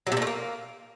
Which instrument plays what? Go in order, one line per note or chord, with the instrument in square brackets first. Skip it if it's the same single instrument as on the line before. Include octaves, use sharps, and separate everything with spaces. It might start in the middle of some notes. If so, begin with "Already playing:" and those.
[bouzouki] F#3
C3
A#2
A3
A#3